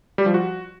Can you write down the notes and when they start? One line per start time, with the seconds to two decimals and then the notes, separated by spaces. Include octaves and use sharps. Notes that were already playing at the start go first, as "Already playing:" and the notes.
0.18 G3
0.26 F3
0.34 F#4